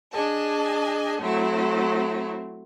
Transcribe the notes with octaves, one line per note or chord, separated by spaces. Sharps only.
D4 G#4 D#5 G#5 A5
F#3 A3 C4 E4